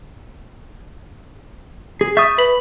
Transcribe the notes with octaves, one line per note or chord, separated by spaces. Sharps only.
G#4
E5 C#6 D#6 G6 A6
B4 B5 B6 F#7